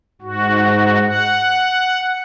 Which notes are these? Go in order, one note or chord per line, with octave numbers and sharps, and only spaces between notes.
G#2 F#4
F#5